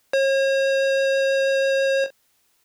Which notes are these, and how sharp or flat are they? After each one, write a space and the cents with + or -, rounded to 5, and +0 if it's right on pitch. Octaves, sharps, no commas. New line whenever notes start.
C#5 -40